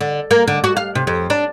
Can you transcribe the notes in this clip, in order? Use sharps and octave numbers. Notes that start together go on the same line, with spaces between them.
D3
A#3
D3
F#4
F5
C3
F2
D4